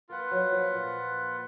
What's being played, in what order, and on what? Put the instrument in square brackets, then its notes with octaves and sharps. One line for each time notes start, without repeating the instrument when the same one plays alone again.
[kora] A#3 [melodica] F4 B4 F#5
[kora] F#3
F3
A#2